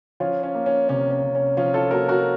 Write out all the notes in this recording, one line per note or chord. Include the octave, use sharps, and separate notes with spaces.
F3 C#4 F4
C#4
A#3
C#4
C3 C#4
C#4
C3
C#4
F3 C#4 F4
F4 A4
A#3 F#4 A#4
F#4 A#4